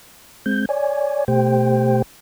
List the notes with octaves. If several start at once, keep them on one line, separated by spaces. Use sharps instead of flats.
G#3 C4 G6
C#5 D5 G#5
B2 A3 G4 C5 G5